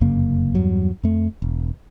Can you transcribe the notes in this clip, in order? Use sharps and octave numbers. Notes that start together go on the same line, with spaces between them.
F1 F#2 C#3 A#3
E2 G2 F#3
F2 A3
E1